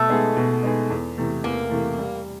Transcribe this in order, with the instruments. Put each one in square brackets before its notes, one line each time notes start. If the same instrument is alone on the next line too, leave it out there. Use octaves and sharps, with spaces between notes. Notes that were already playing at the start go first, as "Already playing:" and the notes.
Already playing: [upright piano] B2 [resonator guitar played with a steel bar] A3
[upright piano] G#3 B3 D#4 G#4
B2
G#3 B3 D#4 G#4
E2
C3 E3 A3
[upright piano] E2 [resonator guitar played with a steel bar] A#3
[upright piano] C3 E3 A3
G3